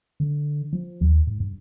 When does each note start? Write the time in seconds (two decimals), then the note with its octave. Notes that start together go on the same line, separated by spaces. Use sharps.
0.20 D3
0.73 F3
1.01 D#2
1.27 G#2
1.40 G2